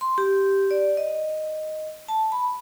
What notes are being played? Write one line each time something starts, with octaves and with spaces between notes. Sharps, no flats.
C6
G4
D5
D#5
A5
B5